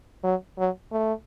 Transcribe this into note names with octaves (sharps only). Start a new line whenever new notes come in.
F#3
F#3
A3